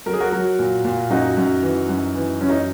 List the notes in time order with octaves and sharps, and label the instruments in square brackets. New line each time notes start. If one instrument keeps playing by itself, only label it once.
[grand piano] F#3 A#4
G#4
F#4 A#4
F#3
A#2
A#2
F#2 D#4 F#4
F#2
E3
F#2
E3
F#2 C#4
D#4